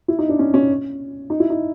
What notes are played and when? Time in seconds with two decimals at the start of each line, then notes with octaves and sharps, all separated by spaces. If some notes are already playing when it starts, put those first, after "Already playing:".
0.08 E4
0.19 D#4
0.29 D4
0.39 C#4
0.54 C#4
1.30 D#4
1.40 E4
1.50 D#4